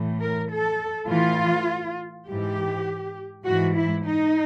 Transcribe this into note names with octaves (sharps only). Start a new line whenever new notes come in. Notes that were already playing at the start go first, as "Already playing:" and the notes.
Already playing: A2 E3
A#4
A4
A2 E3 F4
G#2 E3 G4
G#2 E3 F#4
E4
D#4